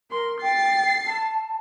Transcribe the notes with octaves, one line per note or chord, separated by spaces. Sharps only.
A#4 C6
G5 A6 C7
A5